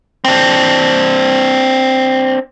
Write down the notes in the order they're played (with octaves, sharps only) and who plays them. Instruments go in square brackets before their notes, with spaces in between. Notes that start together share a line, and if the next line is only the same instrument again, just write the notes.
[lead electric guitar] C4 D4